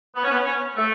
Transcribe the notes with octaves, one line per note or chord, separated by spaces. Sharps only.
B3
C#4
B3
C#4
A3